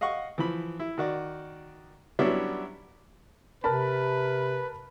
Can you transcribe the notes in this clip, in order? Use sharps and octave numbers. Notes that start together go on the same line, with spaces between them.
D#5 F5 F#5 C#6
E3 F3 B5
E4
D#3 F#4 D5
F#3 G3 B3 C#4 D4 E4
C3 A#4 B4 A5 B5